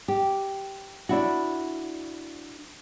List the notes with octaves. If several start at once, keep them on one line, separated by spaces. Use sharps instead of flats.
G4
D4 E4 F#4